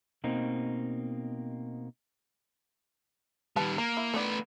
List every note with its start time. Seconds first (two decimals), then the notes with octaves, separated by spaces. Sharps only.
0.24 B2 A#3 C4 D#4
3.56 D#3 G3 B4 A5
3.78 A#3 A#5
3.97 E4
4.14 D#3 A3 B3 B4 D5